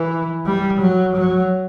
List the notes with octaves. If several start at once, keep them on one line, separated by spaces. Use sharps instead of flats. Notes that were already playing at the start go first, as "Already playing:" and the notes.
Already playing: E3
G3
F#3
F#3